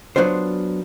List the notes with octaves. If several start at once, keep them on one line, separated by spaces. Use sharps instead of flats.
F#3 B3 D4 F4 C5